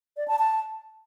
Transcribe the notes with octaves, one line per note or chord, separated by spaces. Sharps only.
D5
A5
A5